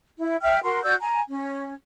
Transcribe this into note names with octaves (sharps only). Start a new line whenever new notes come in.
E4
E5 G5 F6
F#4 A#4 C6
F#4 D5 E6 G6
G#5 A#5
C#4